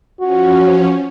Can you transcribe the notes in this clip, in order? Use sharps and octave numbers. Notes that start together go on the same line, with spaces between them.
F3 C#4 F#4